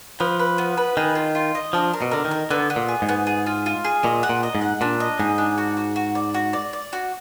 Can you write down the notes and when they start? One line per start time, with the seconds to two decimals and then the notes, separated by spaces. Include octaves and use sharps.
0.20 F3 B4
0.39 B4
0.58 B3
0.77 B4
0.97 D#3 G#4
1.15 F4
1.35 F4
1.55 D#5
1.73 F3 D4
1.93 A#4
2.02 B2
2.11 D3 A#4
2.25 D#3
2.31 A#4
2.51 D3 B3
2.70 B3
2.76 A#2
2.88 G#4
3.02 G#2
3.09 B3
3.27 G#4
3.46 F4
3.66 F4
3.85 G#4
4.03 A#2 D#5
4.23 F#5
4.29 A#2
4.43 D#5
4.55 G#2
4.61 F#5
4.81 A#2 D4
5.00 D#5
5.19 G#2 G#4
5.38 D4
5.58 F#4
5.77 F#4
5.96 F#4
6.15 D5
6.34 F#4
6.53 D5
6.73 D5
6.93 F#4